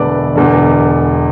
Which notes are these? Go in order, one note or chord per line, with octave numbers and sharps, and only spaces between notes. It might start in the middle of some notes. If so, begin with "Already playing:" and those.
Already playing: E1 E2 D3 A3 A4 B4 D5
E1 E2 D3